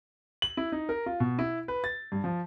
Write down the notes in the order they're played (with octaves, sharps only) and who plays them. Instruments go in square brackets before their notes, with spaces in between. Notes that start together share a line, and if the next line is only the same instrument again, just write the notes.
[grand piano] F#7
E4
D#4
A#4
F4
B2
E4
B4
A6
G2
F3